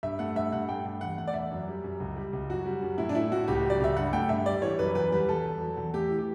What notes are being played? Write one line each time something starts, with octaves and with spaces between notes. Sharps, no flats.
G2 E5
A3 F#5
G2 E5
G2 F#5
A3 G5
G2
E2 F#5
A3 F#5
D5
E2 E5
F#2
G3
F#2
C#2
G3
C#2
F#2 F#4
G3
F#2
A2 E4
D4
A3 E4
A2 F#4
C#2 G4
F#3
D5
C#2 E5
G2 F#5
A3 G5
G2 E5
G3 D5
E3 C#5
F#2 B4
E2 B4
G3 B4
E2 A4
E2
F#3
E2
A3 G4
E3
G4